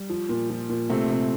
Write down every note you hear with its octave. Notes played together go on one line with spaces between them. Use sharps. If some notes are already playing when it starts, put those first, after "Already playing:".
Already playing: G3
F3
A#2
F3
A#2
C3 A3 C4
C3